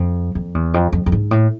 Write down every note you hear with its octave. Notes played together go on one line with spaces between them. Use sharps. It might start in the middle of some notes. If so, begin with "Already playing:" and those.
Already playing: F2
F2
E2
F2
F2
F2
G#2
A2